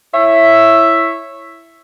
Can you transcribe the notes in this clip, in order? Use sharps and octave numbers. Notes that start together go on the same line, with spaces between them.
E4 C#5 E5